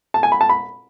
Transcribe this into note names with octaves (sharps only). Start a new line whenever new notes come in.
A5
G#5
B5
A5
B5